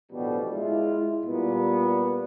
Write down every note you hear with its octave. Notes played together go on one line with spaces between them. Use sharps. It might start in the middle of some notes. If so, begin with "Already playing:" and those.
A1 B2 D3 F3 G3
G#3 E4 F4
A#2 G3 B3